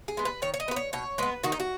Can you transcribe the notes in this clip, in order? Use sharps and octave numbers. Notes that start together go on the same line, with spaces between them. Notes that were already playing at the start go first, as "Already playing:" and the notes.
G#4
G#3 B3
B4
D#3 C#5
C#5
D#5
B3 B4
C#5
B2 C#5
G#3 B3 B4
D#3 F#4
D#4
F#4